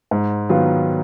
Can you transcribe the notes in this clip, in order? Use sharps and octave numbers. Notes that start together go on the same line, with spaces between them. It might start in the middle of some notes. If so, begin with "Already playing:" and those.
G#2
D#3 F#3 B3 F4